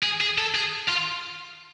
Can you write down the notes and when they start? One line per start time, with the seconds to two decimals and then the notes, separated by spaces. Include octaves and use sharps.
0.03 G#4
0.21 G#4
0.38 A4
0.54 G#4
0.89 F4